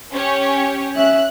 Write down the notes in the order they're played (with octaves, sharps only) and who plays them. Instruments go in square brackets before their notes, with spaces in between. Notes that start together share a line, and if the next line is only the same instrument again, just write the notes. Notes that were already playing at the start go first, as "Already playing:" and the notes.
[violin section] C#4 G4 C#5
[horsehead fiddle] C#4 E5 [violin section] F#6